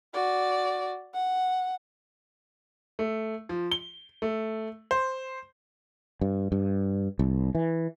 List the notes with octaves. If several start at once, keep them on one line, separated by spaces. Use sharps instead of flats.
F#4 D5
F#5
A3
F3
G7
A3
C5
G2
G2
C2
E3